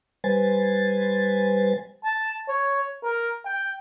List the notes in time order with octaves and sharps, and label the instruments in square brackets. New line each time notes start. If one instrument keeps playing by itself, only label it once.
[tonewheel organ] G3 B4 C5 G#5 A6
[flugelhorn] A5
C#5
A#4
G5